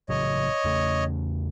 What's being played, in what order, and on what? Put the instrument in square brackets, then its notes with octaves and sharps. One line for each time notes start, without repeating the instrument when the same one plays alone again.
[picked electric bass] A1 C#3 F#3 [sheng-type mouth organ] C#5 D#5
[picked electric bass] E2 C#3 A3